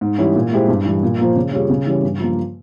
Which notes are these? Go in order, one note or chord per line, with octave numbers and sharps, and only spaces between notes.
G#2
E3 G3 C#4 E4
A#2
G#3 E4 G4 C5
G2
E3 G3
A#2
F3 A#3 F4 C5
C#3
G3 C#4 F4 G#4
C#3
E3 G3 C#4
G2
F3 A#3